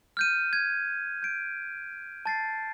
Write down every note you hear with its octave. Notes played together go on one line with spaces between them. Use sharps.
F6 G6 D#7
G#6
G6 D7
A5 A6 C7